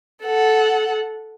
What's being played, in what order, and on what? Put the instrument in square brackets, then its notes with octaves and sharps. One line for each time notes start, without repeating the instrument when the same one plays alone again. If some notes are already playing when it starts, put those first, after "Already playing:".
[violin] A4 F#5